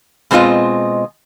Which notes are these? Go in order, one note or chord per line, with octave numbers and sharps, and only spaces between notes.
B2 G#3 C4 F4 D#5